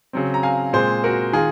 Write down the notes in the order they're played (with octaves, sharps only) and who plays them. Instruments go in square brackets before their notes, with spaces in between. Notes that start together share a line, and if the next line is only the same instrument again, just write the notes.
[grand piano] C#3 F#3 C4
A#5
F5 G#5
A#2 G#3 C4 G#4 C5
F#4 A#4
D#3 F4 G#4